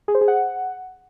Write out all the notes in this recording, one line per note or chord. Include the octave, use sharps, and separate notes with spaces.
G#4
C5
G#4
F#5